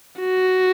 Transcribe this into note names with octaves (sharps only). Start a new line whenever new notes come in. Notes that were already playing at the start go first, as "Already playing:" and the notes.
F#4